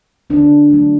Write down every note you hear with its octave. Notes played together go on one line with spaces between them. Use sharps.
D3 D4
F#3 A3